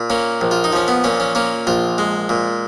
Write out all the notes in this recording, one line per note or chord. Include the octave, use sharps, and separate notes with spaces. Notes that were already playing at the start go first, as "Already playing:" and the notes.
Already playing: A#2
A#3 C#4
A#1
F4
D#4
F3 C#4
B3
A#2 C#4
C#4
A#3 C#4
A#1 F4
G#3
A#2